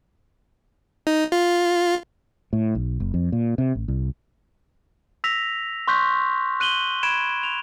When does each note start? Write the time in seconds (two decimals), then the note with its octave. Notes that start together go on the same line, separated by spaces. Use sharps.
1.07 D#4
1.32 F4
2.53 A2
2.75 B1
3.00 F#1
3.14 F2
3.32 A#2
3.58 C3
3.75 A1
3.88 C2
5.24 E6 A#6 B6 F7
5.88 C6 C#6 F#6 G6 B6
6.60 F#6 D#7 F#7 G7
7.03 B5 G#6 D7 E7
7.43 F7